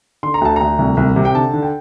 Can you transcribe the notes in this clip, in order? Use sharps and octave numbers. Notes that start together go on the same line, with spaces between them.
D3 C6
A#5
D2 A5
D2 A#5
C2
C2
C3
G5
D3 A5
D3
G5